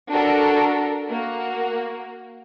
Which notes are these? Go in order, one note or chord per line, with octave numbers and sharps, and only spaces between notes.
D4 F#4 A4 A#4
A#3 F#4